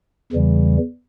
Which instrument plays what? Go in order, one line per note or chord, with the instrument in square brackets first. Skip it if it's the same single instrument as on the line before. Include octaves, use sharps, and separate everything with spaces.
[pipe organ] E2 C#3 E3 G3